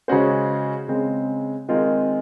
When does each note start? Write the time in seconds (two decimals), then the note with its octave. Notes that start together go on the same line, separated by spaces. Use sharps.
0.08 C#3 G#3 C#4 F#4 C5
0.88 C#3 G#3 C4
1.69 D#3 G#3 C4 F4